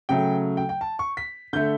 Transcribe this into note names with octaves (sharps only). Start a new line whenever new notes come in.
C#3 F#3 A3 G5
G5
G5
A5
C#6
B6
D3 A3 G6